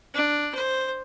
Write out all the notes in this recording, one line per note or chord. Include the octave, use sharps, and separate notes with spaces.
D4
C5